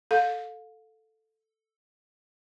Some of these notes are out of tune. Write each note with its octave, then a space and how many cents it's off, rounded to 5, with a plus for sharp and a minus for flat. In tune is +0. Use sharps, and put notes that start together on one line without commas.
A4 +0 F5 +30